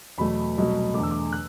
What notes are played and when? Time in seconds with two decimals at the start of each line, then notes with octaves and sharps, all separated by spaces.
0.18 E2 B2 F#3 A3 B5
0.57 C2 B2 F#3 A3
0.94 E2 D3 A3 D6
1.03 E6
1.11 D6
1.33 F#6